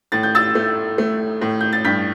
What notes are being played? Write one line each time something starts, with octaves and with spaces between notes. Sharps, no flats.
A2 A6
G6
E6 A6
A3
A3
A2
G6
A6
G2 G6 B6